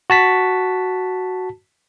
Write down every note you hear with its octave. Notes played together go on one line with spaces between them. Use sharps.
F#4 A5 B6